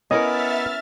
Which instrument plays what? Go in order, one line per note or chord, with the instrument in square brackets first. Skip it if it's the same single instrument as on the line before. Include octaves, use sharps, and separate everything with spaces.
[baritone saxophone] B3 [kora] C#4 E4 A#4 [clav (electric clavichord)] D#5 [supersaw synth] E5 F6 A6